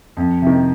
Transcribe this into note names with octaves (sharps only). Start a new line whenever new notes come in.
F2
C3 D#3